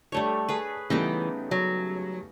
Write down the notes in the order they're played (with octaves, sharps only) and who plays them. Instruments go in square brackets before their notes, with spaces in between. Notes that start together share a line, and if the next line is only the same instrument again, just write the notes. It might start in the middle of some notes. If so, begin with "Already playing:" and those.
[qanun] G3 A3 C#5 [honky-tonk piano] D4 A4
[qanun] G#4 B4
[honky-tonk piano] C#3 G3 A3 [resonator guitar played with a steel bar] E3 [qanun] B3 D#4 G5
[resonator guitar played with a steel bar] F#3